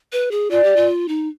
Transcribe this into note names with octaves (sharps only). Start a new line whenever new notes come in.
B4
G#4
F4 D5
G4
F4
D#4